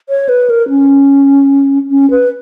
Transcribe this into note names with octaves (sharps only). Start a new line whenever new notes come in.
C#5
B4
A#4
C#4
C#4
B4